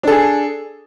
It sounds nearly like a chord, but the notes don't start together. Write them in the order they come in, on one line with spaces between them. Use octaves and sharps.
D4 A4 G#4